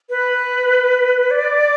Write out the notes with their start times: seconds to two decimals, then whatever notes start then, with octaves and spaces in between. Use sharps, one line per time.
0.09 B4
1.31 D5